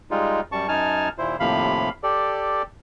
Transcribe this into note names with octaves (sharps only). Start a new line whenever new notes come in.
G3 G#3 D#4 F4
F#2 G3 A5 C#6
F#2 D#4 G#5 A5 F6
D#2 A#2 E4 C5
D#2 A2 C3 F3 F5 B5
G4 A4 D5